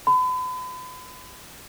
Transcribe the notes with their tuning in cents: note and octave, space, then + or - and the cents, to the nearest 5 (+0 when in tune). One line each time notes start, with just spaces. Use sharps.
B5 +40